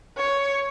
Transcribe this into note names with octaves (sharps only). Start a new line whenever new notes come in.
C#5